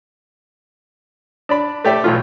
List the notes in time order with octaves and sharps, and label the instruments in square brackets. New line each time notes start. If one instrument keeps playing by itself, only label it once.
[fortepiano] D4 D5 B5
A3 G4 D5 E5
B1 A2 E3 A3 F4